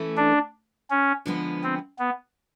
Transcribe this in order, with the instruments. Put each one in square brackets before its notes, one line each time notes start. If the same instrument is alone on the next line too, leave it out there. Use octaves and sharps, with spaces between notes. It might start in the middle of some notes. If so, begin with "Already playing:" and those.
Already playing: [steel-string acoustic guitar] E3 A3 C#4
[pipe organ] D4
C#4
[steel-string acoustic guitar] D3 F3 G#3 B3
[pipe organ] C4
B3